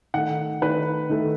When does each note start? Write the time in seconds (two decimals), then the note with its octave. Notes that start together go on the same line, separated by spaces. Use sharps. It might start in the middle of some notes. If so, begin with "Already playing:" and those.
0.14 D#3 A3 F#5
0.62 D#3 A3 B4
1.10 D#3 A3